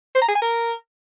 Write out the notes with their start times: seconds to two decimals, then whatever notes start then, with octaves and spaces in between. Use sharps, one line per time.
0.15 C5
0.22 A#5
0.28 G#4
0.35 G#5
0.42 A#4